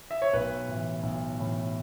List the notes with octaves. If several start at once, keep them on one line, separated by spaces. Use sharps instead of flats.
E5
C#5
B1 B4
A2 E3
B1
A2 E3